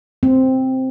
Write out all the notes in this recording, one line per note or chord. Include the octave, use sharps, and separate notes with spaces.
C4